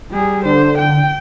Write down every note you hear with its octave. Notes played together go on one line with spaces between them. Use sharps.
G3 G#4
D3 C5
G5